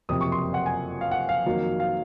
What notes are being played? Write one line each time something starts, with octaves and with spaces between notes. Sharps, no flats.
F#1 F2 C3 D#6
C#6
C6
F#5
G#5
F5
F#5
F5
F2 D#3 F#3 A#3
F5